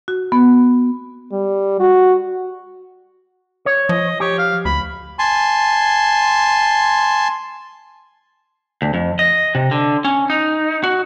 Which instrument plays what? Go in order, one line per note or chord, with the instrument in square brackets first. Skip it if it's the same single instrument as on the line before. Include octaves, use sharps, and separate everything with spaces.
[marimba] F#4
B3
[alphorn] G3
F#4
[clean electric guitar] C#5
[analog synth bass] F3 [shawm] D#5
[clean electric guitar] G4 [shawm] C#5
[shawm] F5
[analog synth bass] D2 [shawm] B5
[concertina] G#5 A5 C6
[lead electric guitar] D2
F2
D#5
C3
D3
C#4
D#4
F#4